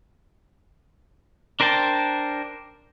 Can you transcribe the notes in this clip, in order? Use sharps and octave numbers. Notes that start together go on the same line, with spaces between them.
D4 A#4 C5 G5 A5